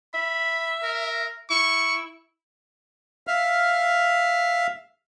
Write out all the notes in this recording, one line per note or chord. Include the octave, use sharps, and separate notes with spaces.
E5 B5
A#4
E4 C#6
E5 F5 F6